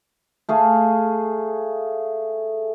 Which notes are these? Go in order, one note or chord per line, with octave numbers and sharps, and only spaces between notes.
A3 G#4 F5